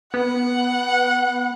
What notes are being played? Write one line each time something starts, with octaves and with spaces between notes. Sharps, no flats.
B3 F#5